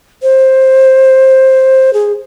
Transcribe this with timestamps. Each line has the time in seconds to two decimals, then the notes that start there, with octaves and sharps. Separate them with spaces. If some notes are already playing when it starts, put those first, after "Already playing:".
0.22 C5
1.93 G#4